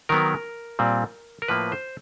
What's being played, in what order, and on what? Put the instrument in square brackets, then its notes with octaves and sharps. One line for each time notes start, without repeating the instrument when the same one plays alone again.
[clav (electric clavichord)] D#3 F#3 B3 A#4
A#2 G3 C4
A#4
A2 F3 A#3 B4
C5